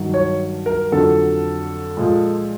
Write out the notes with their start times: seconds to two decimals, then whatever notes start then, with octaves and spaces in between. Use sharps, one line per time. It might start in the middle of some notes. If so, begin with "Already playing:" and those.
Already playing: G2 D#3 F#3
0.14 C#5
0.66 A#4
0.92 F2 D3 F#3 A4
1.97 A#2 F3 G#3